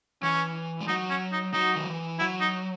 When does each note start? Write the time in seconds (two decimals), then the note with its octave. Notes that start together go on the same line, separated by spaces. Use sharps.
0.23 E3 C#4
0.81 G#3
0.88 F#3 D#4
1.10 C#4
1.32 D#4
1.53 F#3 D#4
1.75 D#3
1.86 E3
2.19 F#3 E4
2.41 D#4